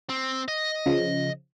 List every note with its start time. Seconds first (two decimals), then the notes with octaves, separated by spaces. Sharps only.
0.09 C4
0.48 D#5
0.86 C#3 F3